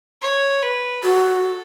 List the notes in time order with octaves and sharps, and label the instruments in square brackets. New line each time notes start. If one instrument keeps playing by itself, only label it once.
[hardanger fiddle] C#5
B4
[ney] F#4 [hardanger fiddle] A4